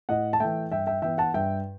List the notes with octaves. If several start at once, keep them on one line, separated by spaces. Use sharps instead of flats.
A2 D#5 F#5
A5
E3 A3 E5 G5
G2 E5 G5
E5 G5
E3 B3 E5 G5
F#5 A5
G2 E5 G5